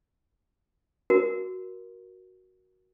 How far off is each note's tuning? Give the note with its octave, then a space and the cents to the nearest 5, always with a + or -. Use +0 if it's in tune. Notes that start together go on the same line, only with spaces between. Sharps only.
F#4 +0 A#4 +15